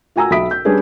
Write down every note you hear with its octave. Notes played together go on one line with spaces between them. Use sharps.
F4 F#4 G#5 A#5 E6
B1 E5 B5 D#6 B6 D7
G6
G3 C#4 D4 G#4 B4